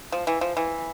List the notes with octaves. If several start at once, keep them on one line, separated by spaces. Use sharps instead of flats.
F3
E3
F3
E3